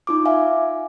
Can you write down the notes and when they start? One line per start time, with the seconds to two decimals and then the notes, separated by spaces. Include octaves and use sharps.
0.07 D#4 F4 D6
0.26 E5 F5 G#5